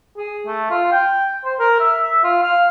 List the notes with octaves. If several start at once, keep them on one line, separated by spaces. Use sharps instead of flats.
G#4
A3
F4
G5
C5
A#4
E5
E5
F4
F5